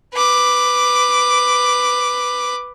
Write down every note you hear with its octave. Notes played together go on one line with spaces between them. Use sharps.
B4 D6